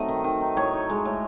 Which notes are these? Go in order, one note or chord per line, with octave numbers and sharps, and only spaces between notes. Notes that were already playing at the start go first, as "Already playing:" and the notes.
Already playing: F#3 A3 C4 D#4 D#5
D#3
D#3
D#4
A2 C#5
D#4
G#3
A2